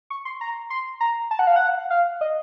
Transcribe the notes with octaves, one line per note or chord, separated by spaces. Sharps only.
C#6
C6
A#5
C6
A#5
A5
F#5
F5
F#5
F5
D#5